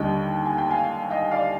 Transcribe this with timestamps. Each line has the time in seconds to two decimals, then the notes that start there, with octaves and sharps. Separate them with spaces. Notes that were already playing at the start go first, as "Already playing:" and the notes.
Already playing: D#2 D3 G3 D#5 G5
0.45 G#5
0.58 G5
0.71 F5 G#5
1.10 D#5 G5
1.31 D5 F5